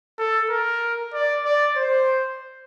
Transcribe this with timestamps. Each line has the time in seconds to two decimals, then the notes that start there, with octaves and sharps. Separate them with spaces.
0.18 A4
0.49 A#4
1.14 D5
1.45 D5
1.77 C5